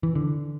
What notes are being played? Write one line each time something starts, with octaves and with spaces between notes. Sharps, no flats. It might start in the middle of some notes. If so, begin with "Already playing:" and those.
E3
D3